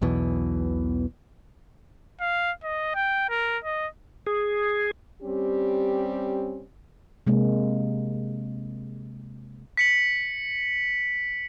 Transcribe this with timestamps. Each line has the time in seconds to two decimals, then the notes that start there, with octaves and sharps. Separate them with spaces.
0.02 B1 E2 B2 E3
2.21 F5
2.64 D#5
2.95 G5
3.29 A#4
3.64 D#5
4.27 G#4
5.23 G3 C4 C#4 G4
7.27 C3 G#3 A#3
9.77 B6 C#7 F#7